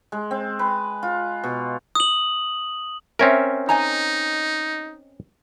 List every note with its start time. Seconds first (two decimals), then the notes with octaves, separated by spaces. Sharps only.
0.12 G#3
0.31 C4
0.59 B4
1.03 F4
1.44 B2
1.95 D#6 F#7
3.19 C4 C#4 A#4 E5
3.69 D#4 D#5 G#5 A#5